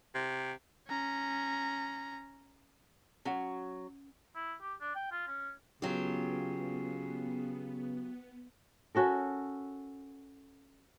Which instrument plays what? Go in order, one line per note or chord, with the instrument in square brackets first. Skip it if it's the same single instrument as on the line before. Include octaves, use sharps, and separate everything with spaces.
[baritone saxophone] C3
[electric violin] C#4 A#5
[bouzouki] F#3 [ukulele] C#4 C#5 F#5
[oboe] E4
G4
D4
G5
F4
C#4
[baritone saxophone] C#3 [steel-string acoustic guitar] F#3 F4 G4 [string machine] B3
[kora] C#4 F#4 A4 A#4